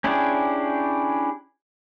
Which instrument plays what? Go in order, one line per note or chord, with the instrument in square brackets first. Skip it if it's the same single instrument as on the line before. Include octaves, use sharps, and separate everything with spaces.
[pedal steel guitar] C#4 D4 E4 G4 G#4